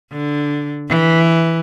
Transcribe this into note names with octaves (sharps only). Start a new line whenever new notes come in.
D3
E3